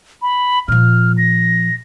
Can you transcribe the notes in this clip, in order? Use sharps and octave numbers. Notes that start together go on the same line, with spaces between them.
B5
A#2 F3 F6
A#6